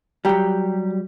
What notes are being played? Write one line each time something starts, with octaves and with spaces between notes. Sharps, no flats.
F#3 G3 G4 A#5